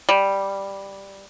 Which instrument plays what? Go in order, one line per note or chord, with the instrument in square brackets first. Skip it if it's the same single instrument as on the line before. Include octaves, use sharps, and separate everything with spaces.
[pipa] G3